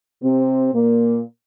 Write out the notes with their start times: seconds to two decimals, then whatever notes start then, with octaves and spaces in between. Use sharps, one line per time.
0.23 C3 C4
0.74 A#2 A#3